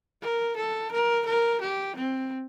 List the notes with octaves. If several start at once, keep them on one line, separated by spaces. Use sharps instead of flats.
A#4
A4
A#4
A#4
G4
C4